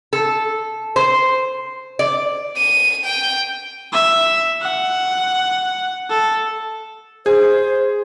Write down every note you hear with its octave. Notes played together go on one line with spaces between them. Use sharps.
A4
C5
D5
D#7
G5
E5
F#5
A4
G#4 C5